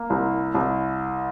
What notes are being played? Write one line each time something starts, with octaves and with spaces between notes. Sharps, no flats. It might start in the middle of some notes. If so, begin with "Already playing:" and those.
Already playing: A#3
C2
C2